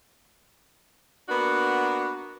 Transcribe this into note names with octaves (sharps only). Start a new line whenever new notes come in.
A#3 B3 D4 F#4